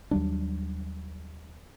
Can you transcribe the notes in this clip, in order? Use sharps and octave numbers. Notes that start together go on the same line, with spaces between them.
D#2 F#3 G3 D4